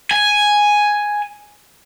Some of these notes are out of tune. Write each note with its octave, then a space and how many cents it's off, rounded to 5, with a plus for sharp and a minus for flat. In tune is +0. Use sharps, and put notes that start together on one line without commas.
G#5 +0